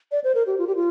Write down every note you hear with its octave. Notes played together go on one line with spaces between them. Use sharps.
D5
C5
A#4
G4
F4
G4
F4